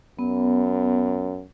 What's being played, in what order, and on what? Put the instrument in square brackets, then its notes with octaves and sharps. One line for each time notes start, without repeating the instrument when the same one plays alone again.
[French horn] F#2 [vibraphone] B3